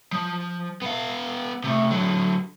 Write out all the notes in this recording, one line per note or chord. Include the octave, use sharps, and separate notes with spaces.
F3
B3 F5
C3 A3
D3 F#3